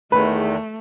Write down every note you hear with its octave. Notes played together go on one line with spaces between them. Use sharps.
E2 D#3 G#3 A3 B4